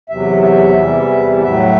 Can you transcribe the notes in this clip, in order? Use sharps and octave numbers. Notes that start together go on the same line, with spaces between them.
E2 C3 F#3 E5
E5
E2 C3 E3 G3
A2 F#3 E5